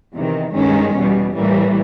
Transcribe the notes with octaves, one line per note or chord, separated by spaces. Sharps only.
E2 C3 D#3
G2 D#3 G#3 C#4
E2 B2 G3
A2 E3 G3 A#3